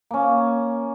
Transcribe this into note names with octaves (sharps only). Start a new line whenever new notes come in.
A#3 C#4